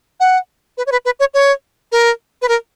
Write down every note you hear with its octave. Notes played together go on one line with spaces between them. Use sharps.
F#5
B4
C#5
B4
B4
C#5
C#5
A#4
B4
A#4